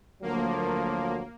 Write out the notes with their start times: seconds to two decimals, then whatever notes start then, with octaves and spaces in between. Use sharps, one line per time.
0.22 D2 F3 F#3 A#3